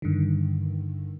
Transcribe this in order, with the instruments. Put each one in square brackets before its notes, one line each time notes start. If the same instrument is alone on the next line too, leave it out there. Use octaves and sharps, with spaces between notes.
[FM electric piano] G2 D3 D#3